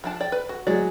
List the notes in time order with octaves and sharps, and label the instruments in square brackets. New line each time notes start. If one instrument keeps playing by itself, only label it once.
[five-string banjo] F3 D4 A5
D5 G5
B4
F#4
[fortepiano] F#3 G#3 [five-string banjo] D5